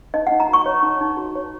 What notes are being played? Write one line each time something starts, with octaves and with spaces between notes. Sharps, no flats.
D#4 D#5
F#5
D#4
A#5
F#4 C#6
C#5
D#4
D#4
F#4
C#5